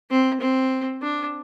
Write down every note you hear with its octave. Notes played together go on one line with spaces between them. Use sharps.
C4
C4
D4